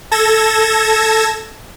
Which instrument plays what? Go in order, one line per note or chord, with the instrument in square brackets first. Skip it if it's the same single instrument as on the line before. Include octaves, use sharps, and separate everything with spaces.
[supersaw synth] A4 G#6 A#6 E7